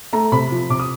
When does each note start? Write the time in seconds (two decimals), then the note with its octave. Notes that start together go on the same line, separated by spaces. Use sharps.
0.13 A3 A#5
0.32 C3 B5
0.51 F3
0.70 C3 D6
0.80 D#6